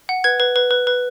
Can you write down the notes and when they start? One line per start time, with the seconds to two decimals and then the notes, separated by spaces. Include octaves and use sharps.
0.09 F#5
0.24 B4 G#6
0.40 B4
0.56 B4
0.71 B4
0.87 B4